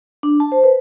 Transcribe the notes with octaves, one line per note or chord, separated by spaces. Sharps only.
D4
A5
C5
B4